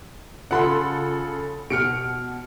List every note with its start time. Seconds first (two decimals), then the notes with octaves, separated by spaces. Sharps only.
0.51 C#3 F4 A4 F#5 B5 C6
1.70 B2 F6 C#7 D7